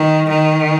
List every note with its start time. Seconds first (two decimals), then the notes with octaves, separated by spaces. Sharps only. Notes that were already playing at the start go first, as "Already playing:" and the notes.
Already playing: D#3
0.29 D#3